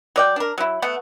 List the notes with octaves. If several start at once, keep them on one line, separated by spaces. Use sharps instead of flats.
F#3 D5 G5
D4 A#4
F#3 E4
A3 B3 F#5